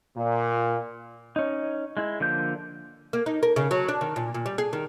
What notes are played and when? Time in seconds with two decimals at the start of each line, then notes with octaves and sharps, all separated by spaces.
0.17 A#2
1.36 C#4 D#4
1.97 G#3 E4
2.20 D3 F3 A#3 G6
3.13 A#3
3.26 D#4
3.43 A#4
3.56 C#3
3.71 F#3
3.89 D4
4.01 D#3
4.16 A#2
4.34 A#2
4.46 G3
4.58 G#4
4.73 D#3